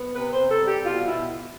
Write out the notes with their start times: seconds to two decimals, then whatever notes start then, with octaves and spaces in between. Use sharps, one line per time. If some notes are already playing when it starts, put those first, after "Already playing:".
Already playing: B3
0.15 C3 B4
0.33 C5
0.38 C3
0.49 A4
0.61 G3
0.66 G4
0.83 B2 F4
1.06 B2 E4